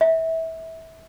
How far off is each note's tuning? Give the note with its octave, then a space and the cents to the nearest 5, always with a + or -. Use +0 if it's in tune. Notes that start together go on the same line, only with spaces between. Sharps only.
E5 -25